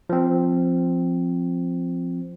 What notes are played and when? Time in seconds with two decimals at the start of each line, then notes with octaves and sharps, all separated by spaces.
0.10 F3 C4